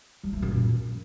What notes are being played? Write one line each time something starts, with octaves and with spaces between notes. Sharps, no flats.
G3
A3
F#2
A#2